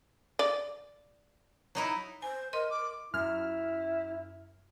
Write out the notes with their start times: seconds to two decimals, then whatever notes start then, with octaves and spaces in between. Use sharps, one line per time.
0.39 D5
1.75 F#3 D#4 E4
2.22 C5 G#5
2.53 A#4 D#5 C6
2.71 D6
3.14 F#2 E4 F6